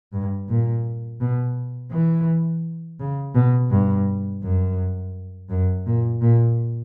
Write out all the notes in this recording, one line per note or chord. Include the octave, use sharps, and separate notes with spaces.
G2
A#2
B2
E3
C#3
B2
G2
F#2
F#2
A#2
A#2